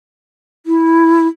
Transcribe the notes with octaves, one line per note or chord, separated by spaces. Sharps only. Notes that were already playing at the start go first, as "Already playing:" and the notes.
E4